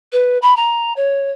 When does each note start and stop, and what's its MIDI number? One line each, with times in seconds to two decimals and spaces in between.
0.12 0.38 71
0.42 0.56 83
0.56 0.93 82
0.96 1.31 73